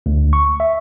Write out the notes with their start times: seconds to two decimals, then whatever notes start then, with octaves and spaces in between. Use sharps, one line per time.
0.06 D2
0.33 C#6
0.60 E5